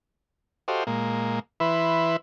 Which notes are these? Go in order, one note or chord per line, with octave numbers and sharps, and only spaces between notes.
F#4 G4 A4 C5 D#5 F5
A#2 G#3 A#3
E3 E4 B4 E5 C6